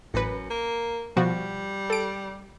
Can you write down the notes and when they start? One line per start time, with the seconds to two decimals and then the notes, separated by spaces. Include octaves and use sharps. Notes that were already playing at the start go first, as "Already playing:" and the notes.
0.14 A1 F#2 B4
0.50 A#3
1.17 B2 F3 G3 F#4
1.90 A4 D7